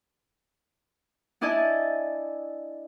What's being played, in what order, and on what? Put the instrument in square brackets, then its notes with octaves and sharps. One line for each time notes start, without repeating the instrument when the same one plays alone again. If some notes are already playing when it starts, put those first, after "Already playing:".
[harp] D4 E4 D5 D#5 G#5 A5